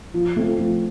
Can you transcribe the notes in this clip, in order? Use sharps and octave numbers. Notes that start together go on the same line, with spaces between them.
F3
A3 C4 F4
F3